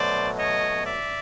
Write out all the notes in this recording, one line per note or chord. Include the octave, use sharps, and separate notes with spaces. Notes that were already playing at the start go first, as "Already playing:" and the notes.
Already playing: B2 F#3 A3 C5 D5
C#5 D#5
D5 E5